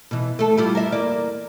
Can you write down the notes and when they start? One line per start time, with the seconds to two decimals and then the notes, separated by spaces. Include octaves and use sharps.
0.11 B2 E3
0.39 A3 A4
0.57 G3 E4 F4
0.75 A#4 E5
0.92 E2 A#3 D5